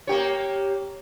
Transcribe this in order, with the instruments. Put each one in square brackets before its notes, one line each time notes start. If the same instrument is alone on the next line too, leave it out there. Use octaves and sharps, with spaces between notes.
[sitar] A#3 G4 C#5